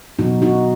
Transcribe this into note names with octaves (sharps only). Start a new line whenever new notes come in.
B2 F#3 B3 D#4 F#4
D#4 F#4